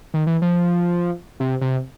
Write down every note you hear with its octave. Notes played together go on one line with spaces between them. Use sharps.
D#3
E3
F3
C3
C3